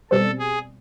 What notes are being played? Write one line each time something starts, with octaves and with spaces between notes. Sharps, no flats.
B2 G3 C4 A4
G#4